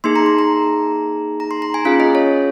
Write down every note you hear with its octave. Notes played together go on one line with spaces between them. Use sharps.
A#3 D#4 G#4 C6
A#5
C6
A#5
A#5
C6
A#5
G#5
C#4 F4 G#4 F5
D#5
C#5